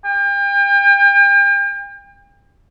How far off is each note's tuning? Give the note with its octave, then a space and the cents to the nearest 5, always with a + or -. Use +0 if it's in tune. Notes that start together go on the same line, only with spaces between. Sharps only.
G5 +40